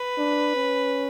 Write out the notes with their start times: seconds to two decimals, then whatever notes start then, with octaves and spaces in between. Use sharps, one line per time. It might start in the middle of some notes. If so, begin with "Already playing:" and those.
Already playing: B4
0.18 D4
0.56 C#4